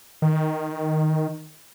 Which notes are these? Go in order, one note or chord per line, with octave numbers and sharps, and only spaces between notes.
D#3